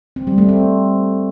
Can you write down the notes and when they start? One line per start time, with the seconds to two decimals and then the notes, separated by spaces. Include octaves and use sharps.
0.16 C4
0.27 G3
0.38 A3
0.49 C4